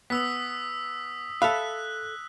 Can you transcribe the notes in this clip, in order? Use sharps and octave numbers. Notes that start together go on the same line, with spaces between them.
B3 D#6 E6 B6
A4 E5 F5 B5 F#6